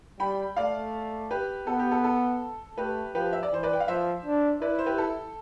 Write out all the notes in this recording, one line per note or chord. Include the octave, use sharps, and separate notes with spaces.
G3 G5 B5
A3 D5 F5
G4 B4
B3 A4
G4
A4
A4
A3 G4 B4
F3 G4 B4
E5
D5
E3 C5
B4 D5
G5
F5
F3 C5 E5
D4
E4 B4 D5
C5
G4 B4
A4